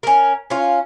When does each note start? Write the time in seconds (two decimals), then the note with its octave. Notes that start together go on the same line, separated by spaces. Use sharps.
0.03 C#4 A#4
0.50 C#4 F4